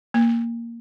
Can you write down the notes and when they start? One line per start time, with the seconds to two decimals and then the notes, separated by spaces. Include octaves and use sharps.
0.14 A#3